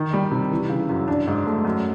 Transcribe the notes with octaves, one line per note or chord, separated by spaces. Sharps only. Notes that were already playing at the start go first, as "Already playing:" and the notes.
Already playing: D#3
G3
C3
E3
C#3
F#2
D4
G#2
A3
F#2